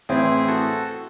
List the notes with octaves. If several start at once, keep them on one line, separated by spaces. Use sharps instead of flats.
A2 E3 C4 E4 G#4
F#4 A4